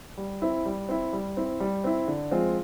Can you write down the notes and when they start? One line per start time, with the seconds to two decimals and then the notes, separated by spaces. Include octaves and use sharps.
0.17 G3
0.42 C4 E4
0.66 G3
0.89 C4 E4
1.13 G3
1.37 C4 E4
1.60 G3
1.84 C4 E4
2.08 D3
2.31 F3 G#3 C4 F4